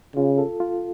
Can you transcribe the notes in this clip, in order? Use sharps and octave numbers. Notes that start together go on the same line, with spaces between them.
C#3 F4
A4
F4